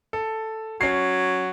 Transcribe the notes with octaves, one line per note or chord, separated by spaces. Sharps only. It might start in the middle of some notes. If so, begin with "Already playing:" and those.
A4
F#3 C#4 C7